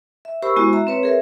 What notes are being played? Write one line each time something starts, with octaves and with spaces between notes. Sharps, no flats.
E5
G4 A#4 C5 B5 C#6 E6
G#3 B3 E4 F#4 G#5
E5 A#5
C4 B4 C#5
G#4 A#4 E5